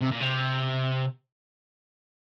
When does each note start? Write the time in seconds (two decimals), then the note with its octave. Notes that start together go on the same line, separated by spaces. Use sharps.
0.01 C3
0.11 A#2
0.21 C3